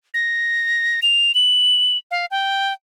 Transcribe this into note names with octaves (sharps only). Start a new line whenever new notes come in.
A#6
F7
F#7
F5
G5